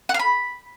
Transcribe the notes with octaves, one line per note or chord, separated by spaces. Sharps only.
F#5
F5
B5